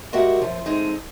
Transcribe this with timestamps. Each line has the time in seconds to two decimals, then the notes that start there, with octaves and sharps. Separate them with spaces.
0.13 G#3 F#4 G4 A#4 E5 F#5
0.41 F#2 F3
0.66 G#3 C4 D#4 A4